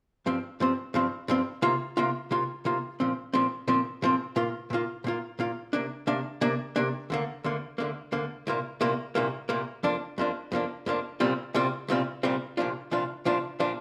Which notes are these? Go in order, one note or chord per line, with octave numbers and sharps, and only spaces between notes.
G2 F3 C4
G2 F3 C4
G2 F3 C4
G2 F3 C4
C3 A#3 F4
C3 A#3 F4
C3 A#3 F4
C3 A#3 F4
A#2 F3 C4
A#2 F3 C4
A#2 F3 C4
A#2 F3 C4
A#2 A#3 F4
A#2 A#3 F4
A#2 A#3 F4
A#2 A#3 F4
C3 A#3 D4
C3 A#3 D4
C3 A#3 D4
C3 A#3 D4
D2 D3 A#3
D2 D3 A#3
D2 D3 A#3
D2 D3 A#3
C2 A#2 A#3
C2 A#2 A#3
C2 A#2 A#3
C2 A#2 A#3
F2 F3 A#3 D4
F2 F3 A#3 D4
F2 F3 A#3 D4
F2 F3 A#3 D4
C2 A#2 G3 C4 F4
C2 A#2 G3 C4 F4
C2 A#2 G3 C4 F4
C2 A#2 G3 C4 F4
C2 A#2 F3 D4 F4
C2 A#2 F3 D4 F4
C2 A#2 F3 D4 F4
A#2 F3 D4 F4